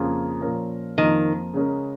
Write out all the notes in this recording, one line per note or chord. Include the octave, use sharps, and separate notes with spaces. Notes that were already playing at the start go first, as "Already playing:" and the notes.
Already playing: F2 C#3 A#3 F4 G#4
A#2 F3 C#4 A#4
F2 D#3 F3 A#3
C#3 G#3 C#4 A#4